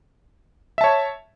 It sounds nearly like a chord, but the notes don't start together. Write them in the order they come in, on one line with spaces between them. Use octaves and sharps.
E5 A5 C#5